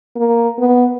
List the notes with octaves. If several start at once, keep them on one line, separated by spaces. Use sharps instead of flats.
A#3
B3